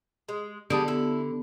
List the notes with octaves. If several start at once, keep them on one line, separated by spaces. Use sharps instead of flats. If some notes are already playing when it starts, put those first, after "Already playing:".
G#3
D3 G3 B3 G#4 A5
E4